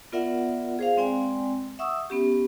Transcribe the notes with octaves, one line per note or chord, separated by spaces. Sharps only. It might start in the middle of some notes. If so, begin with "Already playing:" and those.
B3 F4 A#4 D5 E5 F#5
G#4 C5 F5
G#3 C4 D5 G5 G#5
E5 F#5 C#6 D#6 E6
B3 C#4 G4